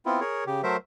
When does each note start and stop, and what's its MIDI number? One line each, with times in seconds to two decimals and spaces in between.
0.06 0.20 59
0.06 0.20 60
0.06 0.20 64
0.06 0.20 65
0.20 0.44 68
0.20 0.44 70
0.20 0.44 73
0.46 0.61 49
0.46 0.61 67
0.63 0.77 54
0.63 0.77 57
0.63 0.77 70
0.63 0.77 72
0.63 0.77 76